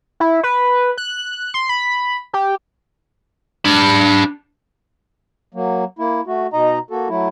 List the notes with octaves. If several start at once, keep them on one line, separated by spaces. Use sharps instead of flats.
E4
B4
F#6
C6
B5
G4
D4 B5
F#3 A#3
A#3 E4
A3 F#4
B2 D#4 D#5 A#5
A#3 F#4 A4
F#3 A3 E4